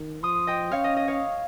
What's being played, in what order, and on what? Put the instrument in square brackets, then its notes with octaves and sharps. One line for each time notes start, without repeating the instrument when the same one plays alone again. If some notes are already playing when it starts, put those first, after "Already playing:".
Already playing: [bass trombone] D#3
[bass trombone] F3 [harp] C6 D#6
[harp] D#5 G5
[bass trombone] C#4 [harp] C#5 F5
[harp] D#5
D#5
C#5 F5